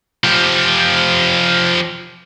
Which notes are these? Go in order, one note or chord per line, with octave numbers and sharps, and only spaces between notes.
F3 G4